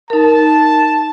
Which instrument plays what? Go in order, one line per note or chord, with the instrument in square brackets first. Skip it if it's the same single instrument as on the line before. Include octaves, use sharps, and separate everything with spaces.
[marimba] D#4 A#4 [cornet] A5